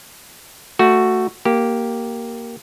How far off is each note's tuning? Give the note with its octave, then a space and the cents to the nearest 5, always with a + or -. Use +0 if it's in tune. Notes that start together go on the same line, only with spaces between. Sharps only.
A3 +10 F#4 +0
A#3 +0 G4 -10